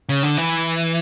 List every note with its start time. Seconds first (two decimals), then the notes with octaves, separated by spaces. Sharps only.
0.09 C#3
0.23 D3
0.37 E3